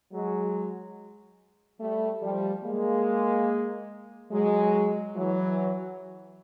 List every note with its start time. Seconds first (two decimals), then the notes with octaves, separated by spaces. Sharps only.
0.13 F#3 G#3
1.80 G3 A3
2.22 F3 G3
2.64 G#3 A#3
4.31 F#3 G#3
5.15 E3 F#3